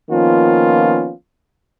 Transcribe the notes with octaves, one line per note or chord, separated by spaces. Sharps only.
D#3 F3 A#3 B3 C#4 F4